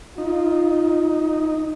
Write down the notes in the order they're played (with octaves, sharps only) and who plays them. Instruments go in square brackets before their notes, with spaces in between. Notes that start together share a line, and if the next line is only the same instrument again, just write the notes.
[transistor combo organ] D#4 [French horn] F4